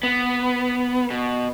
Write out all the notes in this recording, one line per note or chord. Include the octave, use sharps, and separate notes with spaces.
B3
B2